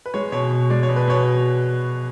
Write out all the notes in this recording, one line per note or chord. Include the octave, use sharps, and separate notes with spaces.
B4
G#3 C#5
B2 C#5
B2
G#3 D5
C#5
B2
B4
B2 C#5